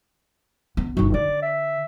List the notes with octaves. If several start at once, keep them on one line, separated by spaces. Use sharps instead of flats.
B3
G1 D#4 F#4
D3 D5
E5